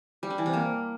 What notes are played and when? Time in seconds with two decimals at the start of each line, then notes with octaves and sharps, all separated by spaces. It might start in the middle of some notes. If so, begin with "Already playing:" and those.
0.23 G3
0.30 D4
0.38 E3
0.46 C3
0.53 A#3